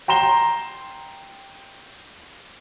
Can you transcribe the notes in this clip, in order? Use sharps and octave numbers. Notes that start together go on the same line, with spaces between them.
G5 A#5 C6 E7 G7